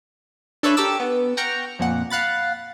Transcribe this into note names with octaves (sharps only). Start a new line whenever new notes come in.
D4 A4 B4 C#5 E5
G4 A4 A#4 A5 D6 E6
B3
F#5 G5 A#5 C#6 F6
F2 A#2 F#5
F5 F#5 B5 A6